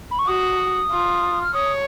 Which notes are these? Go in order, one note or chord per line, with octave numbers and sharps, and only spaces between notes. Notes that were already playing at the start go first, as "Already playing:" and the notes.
B5
C#6
F#4 D#6
F4
F6
C#5 D#6